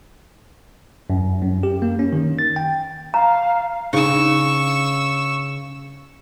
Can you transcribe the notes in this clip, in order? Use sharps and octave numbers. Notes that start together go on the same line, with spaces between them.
F#2
F#2
G4
A#3
C#4
D#3
A6
G5
F5 A#5
C#3 D4 D#4 G#4 C#6 E6